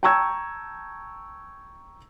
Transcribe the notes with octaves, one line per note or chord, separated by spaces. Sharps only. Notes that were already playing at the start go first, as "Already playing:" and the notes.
G5 A5 A#5 C#6 E6 G#6